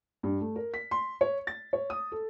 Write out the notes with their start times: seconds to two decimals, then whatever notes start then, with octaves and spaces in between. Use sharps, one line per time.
0.23 G2
0.41 A3
0.56 A#4
0.74 B6
0.91 C6
1.21 C#5
1.47 A6
1.73 C#5
1.90 D#6
2.12 A4